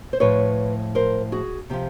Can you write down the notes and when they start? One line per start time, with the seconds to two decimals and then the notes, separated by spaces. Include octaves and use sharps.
0.13 C5
0.20 A2 F3 B4 C#5
0.95 A#4 C5
1.32 F#4 G#4
1.70 C3 F3 F4 G4